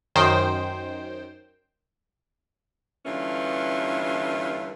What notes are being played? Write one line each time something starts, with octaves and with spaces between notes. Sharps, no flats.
F#2 D#3 C5 G5
G2 D3 E3 A#3 C#4 F4